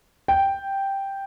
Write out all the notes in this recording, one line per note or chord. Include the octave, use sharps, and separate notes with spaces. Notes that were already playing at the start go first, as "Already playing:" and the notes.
G5